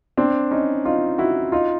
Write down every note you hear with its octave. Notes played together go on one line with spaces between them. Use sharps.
C4 D4
C#4 D#4
D#4 F4
E4 F#4
D#4 F4